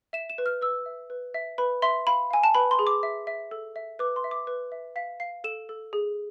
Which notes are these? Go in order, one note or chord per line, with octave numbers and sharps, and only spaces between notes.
E5 E7
E7
B4
F6
B4 E6
E5
B4
E5
B4 B5
E5 C6
F5 B5
F5 G#5
A5
B4 B5
C6
G#4
D6
E5
E5
A4
E5
B4 D6
C6
E5
D6
B4
E5
F5 B6
F5 C7
A4 E7
A4
G#4